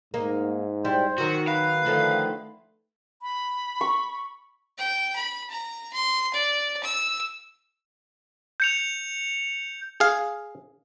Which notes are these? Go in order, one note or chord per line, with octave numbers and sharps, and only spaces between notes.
G#2 A#3 D#4
G3 E4 C5
D#3 F#3 F#4
B4 F5
D3 D#3 F3 A3
B5
C#6
G5
B5
A#5
C6
D5
E6
G6 C#7 F7
G#4 F5